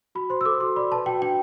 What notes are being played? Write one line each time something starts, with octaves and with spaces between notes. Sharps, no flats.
F#4 B5
C5 C6
E6
A4 D6
F#4 C6
D5 B5
B4 A5
F#4 G5
D4 G5